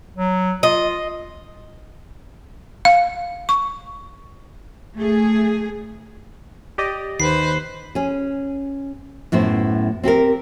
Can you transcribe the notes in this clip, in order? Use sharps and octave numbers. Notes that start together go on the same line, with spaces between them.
F#3
F4 D#5
F5
C#6
A3 G#4
G4 D5 D#5
D#2 B4 C5 C7
C#4 G#4
F#2 A2 B3 C5
C4 G4 A4 A#4